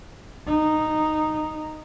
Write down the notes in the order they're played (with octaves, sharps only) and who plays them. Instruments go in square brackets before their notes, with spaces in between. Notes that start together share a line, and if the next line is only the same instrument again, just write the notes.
[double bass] D#4